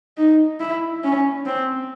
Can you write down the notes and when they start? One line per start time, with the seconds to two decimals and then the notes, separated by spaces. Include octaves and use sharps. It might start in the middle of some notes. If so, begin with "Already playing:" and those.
0.18 D#4
0.60 E4
1.04 C#4
1.46 C4